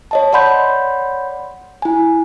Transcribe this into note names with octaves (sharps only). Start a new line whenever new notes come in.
C#5 D#5 A5
C#5 D5 F#5 B5 C6 G6
E4 G#5